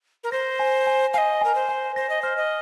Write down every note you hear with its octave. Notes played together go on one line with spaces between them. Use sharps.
A#4
C5 A#6
G#5
G#5
D#5 F5 G#5
A#4 G#5
C5
G#5
C5 A#6
D#5
C5 F6
D#5